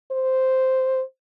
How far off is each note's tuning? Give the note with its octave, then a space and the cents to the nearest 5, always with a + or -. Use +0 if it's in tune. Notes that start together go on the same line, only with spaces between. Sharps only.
C5 -5